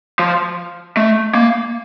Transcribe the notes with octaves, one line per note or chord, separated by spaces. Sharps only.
F3
A3
A#3